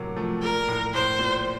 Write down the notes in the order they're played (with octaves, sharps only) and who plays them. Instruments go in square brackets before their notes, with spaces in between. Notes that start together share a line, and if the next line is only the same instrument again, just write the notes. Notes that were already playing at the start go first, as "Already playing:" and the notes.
Already playing: [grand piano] A2 C3 F#3 A#3
F3 A3
[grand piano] A#2 [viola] A#4
[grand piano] A2
[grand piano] A2 [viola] C5
[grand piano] A#2